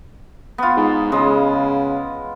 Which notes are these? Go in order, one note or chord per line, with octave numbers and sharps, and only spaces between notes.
B3 F4
G#2
C#3 G#3